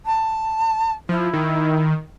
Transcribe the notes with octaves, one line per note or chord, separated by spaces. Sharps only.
A5
F3 E4
D#3